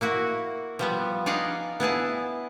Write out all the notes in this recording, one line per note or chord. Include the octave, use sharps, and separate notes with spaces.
A#3 E4 F#4
F3 G3 B3
D#4 G#4 D5 F5 F#5
B3 E4 G#4 A5